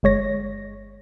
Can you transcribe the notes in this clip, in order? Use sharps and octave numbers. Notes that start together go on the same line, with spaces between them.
G1 G#3 C#5 A#6